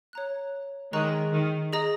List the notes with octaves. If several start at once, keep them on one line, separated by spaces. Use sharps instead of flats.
C#5 A#5 F#6
D#3 G#3 G#4 D#5 A#5 C#6 F#6
D#3
G#4 D#5 A#5 D#6